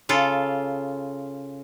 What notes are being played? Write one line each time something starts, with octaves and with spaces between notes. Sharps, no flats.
C#3 F4 A4